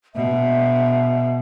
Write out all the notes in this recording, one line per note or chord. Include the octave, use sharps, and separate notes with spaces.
B2 E5